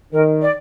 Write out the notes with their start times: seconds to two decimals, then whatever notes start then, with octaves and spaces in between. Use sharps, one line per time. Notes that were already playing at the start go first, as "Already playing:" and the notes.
0.13 D#3 A#4
0.42 D5